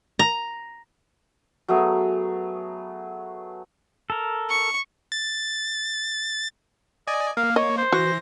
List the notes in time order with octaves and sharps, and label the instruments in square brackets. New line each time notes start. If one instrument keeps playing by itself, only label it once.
[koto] A#5
[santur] F#3 A3 B3 G#4
[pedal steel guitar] A4 A#4
[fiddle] C#6
[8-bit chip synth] A6
[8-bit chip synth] D5 G#5 [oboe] D#5
[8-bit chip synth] A#3 [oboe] F5
[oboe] C#5 [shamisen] D#5
[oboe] C5
[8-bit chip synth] E3 A#6 [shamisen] F#4